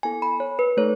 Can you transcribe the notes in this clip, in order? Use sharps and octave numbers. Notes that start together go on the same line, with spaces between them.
B3 E4 A4 G#5
B5
C#5
B4
A3 D#4 A4 C#5